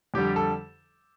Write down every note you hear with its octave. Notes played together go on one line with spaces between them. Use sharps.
F2 D3 G3 G4
A4